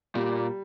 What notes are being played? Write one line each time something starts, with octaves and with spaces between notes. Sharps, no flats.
A#2 G3